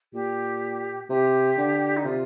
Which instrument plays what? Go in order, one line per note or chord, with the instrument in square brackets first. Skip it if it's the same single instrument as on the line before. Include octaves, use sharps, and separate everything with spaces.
[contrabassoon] A#2 [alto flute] G4
[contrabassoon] C3 [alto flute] G4
[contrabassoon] D3
[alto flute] D#4
[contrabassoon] C3 [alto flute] F4